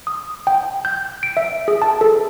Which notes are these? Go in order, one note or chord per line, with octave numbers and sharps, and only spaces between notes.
D#6
G5
G6
D7
E5
G#4
A5
A4